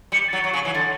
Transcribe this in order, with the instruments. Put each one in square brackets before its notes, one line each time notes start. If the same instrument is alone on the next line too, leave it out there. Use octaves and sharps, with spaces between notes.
[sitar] G3 [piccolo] C#7
[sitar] F#3 [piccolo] A6
[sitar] F#3
C#3
E3
[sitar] D3 [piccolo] A6